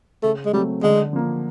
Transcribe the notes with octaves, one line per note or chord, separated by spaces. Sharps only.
C#3 A3
G#3
F#3 G3 A3 C4
D3 G#3
F3 A#3